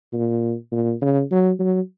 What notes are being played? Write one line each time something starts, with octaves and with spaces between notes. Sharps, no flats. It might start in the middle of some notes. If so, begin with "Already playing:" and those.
A#2
A#2
C#3
F#3
F#3